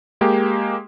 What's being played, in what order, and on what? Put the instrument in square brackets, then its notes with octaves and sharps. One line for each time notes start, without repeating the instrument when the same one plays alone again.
[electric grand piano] G#3 A#3 G4